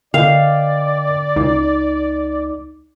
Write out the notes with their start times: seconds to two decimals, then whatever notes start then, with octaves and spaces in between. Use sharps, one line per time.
0.14 D3 A#4 D5 D#5 F5 G5
1.36 C#2 D#4